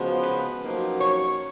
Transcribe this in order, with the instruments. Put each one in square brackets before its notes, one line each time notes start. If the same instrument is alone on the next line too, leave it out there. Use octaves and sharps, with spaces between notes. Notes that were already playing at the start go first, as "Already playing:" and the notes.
Already playing: [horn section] C#3 F3 G#3 B3 F#4
[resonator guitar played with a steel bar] B4
[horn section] F#2 F3 A#3 D#4 F#4
[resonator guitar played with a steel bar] C#5